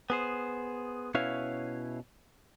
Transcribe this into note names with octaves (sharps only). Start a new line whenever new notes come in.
B3 G#4 C5
B2 C#4 E4 B4 C#5 F5